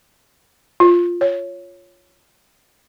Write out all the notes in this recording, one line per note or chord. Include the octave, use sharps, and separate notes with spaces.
F4
C#5